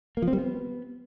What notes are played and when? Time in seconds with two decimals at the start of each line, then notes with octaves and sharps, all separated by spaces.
0.17 A#3
0.22 F3
0.28 C4
0.33 G3
0.38 B3